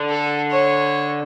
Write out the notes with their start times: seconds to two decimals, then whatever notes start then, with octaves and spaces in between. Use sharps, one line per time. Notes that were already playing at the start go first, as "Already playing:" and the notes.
Already playing: D3
0.10 A4
0.51 C#5